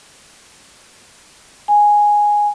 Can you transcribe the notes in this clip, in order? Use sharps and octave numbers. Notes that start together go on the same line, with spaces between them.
G#5